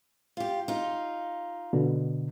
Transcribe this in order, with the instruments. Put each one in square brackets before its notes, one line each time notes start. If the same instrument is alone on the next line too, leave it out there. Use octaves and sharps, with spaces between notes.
[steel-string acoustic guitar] F4 G4
D#4 F4
[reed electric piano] B2 D3